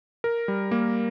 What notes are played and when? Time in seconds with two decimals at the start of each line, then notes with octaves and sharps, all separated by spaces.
0.24 A#4
0.48 G3
0.71 A#3